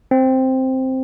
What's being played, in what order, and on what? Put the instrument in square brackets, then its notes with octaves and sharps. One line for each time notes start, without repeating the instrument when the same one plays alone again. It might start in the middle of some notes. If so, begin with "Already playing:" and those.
[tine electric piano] C4